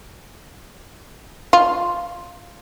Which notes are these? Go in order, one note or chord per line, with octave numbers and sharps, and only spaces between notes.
F4